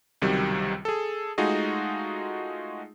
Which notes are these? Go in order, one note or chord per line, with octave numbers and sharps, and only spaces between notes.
C#2 C3 D#3 F#3 G3
G#4 A4
G#3 A3 D#4 F4 F#4 G#4